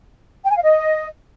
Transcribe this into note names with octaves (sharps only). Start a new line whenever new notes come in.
G5
G#5
F5
D#5